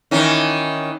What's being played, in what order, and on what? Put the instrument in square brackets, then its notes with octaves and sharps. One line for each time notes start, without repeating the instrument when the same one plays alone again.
[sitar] D#3 E3 C#4